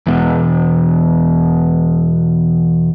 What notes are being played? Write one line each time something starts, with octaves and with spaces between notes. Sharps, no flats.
E2 B2